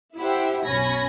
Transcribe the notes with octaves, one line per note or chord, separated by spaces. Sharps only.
E4 G4 C5 E5 F#5
B1 F#2 C#4 G#5 B5 A#6